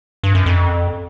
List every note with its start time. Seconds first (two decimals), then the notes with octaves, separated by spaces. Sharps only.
0.24 G2
0.35 F#2
0.46 F2